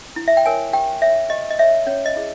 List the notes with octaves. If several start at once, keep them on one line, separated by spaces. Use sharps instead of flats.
E4
E5
G5
A#4 C#5 G#5
G4 G5
C#5 E5
G4 D#5
D#5
C#5 E5
C#4 C#5
D#5
E4 G#4